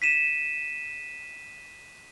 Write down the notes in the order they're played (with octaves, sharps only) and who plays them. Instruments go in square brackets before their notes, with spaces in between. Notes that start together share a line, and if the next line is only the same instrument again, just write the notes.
[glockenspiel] B6 D#7 E7